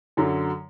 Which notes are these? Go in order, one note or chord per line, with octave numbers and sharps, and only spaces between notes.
F#2 D3 F#3